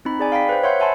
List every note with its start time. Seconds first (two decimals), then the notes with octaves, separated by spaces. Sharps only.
0.05 C4 D#4 B5
0.20 G#4 D5 G#5
0.32 F5 G5 B5 B6
0.49 B4 C5
0.63 C#5 E5 F#5 C6 G6
0.80 E5 F#5 G#5 A5 B5 C6